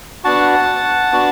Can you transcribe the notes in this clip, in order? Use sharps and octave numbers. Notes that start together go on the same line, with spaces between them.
B3 D4 F#4 F#5 A5
B3 D4 F#4